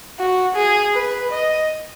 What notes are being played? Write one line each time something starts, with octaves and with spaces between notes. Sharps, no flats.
F#4
G#4
B4
D#5